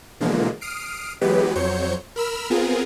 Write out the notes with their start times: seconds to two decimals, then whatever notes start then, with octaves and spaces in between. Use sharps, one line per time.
0.20 B2 D3 E3 F3 G#3 A#3
0.61 D#6 F6 C7 D7
1.21 E3 F#3 G#3 B3 G4 B4
1.55 F2 F#3 C5 C#5 G6 C#7
2.16 A#4 B5 E6 F6
2.50 B3 C4 F4 G#4 A#4